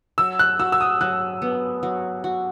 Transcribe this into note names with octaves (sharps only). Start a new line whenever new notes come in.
F#3 E6
F#6
F#4 E6
E6
D#6
F#3 F#6
B3
F#3
F#4